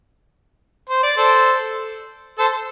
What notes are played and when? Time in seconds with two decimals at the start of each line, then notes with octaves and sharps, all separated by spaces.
0.89 C5
1.03 D5
1.17 A4 C5
2.38 A4 C5